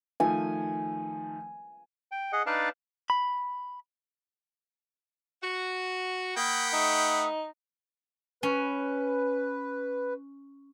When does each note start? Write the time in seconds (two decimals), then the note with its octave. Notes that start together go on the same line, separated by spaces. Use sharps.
0.20 D#3 F3 A3 G#5
2.12 G5
2.32 G#4 D#5 F#5
2.46 D4 D#4 B4 D5 F5 A5
3.10 B5
5.42 F#4
6.36 A#3 F#5 G5 B5 D#6
6.73 A3 D#4 D#6
8.43 C#4 B4